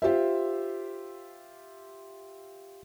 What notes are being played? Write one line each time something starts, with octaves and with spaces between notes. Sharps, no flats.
F4 G4 C5 E5